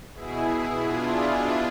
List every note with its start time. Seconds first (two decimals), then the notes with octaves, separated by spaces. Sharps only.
0.14 B2 E4 G#4
0.87 D4 F4